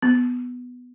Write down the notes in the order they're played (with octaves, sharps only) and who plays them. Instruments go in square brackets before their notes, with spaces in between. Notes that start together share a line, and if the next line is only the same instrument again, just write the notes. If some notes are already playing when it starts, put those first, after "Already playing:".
[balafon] B3